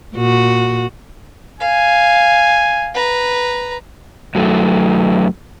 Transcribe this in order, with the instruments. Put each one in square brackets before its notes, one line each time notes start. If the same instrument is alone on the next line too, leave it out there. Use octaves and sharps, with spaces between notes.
[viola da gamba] A#2 F#4
[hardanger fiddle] F5 [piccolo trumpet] G#5
[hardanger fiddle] B4 A#5
[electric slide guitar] F#2 F#3 A3